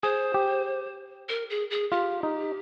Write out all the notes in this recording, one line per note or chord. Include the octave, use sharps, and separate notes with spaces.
G#4 C5
G4
A#4
G#4
G#4
F4 G4
D#4